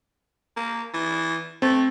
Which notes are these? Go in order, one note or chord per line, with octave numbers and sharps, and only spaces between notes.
A#3
E3
A3 C4